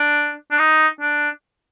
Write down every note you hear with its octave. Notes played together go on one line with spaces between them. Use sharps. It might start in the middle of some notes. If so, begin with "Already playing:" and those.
Already playing: D4
D4
D#4
D4